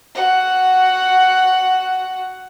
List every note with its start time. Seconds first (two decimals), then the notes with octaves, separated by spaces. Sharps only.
0.15 F#4 F#5